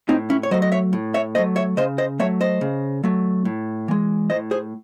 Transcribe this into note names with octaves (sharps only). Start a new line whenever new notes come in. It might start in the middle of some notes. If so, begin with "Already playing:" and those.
A2 C4 D#4
C#4 E4
C#5
F#3 A3 C5 D#5
D#5
C#5 E5
A2
C#5 E5
F#3 A3 C5 D#5
C#5 E5
C#3 C5 D#5
C5 D#5
F#3 A3 C#5 E5
C5 D#5
C#3
F#3 A3
A2
E3 G#3
A2 C5 D#5
G#4 C5